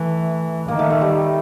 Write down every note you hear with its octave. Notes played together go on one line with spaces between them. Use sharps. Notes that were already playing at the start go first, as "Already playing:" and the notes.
Already playing: E3 A3
D#3 A#3
A3
A3
G3